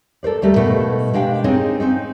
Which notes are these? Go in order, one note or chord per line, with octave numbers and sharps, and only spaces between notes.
A4 A#4 C5 D5
D#2 G3 A3 A#4
B2 A3 A#3 D#4
G#3 D4 G4 F5 G5
G#3 C4 D#4 G#4 C#5 F5
C4 C#4 D#4